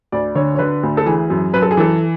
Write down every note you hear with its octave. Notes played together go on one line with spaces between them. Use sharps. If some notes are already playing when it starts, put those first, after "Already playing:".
D2 D5
D3 C#5
C#5
D3 B4
D2
A4
E3 G#4
F#2
F#2 B4
A4
G#4
E3 A4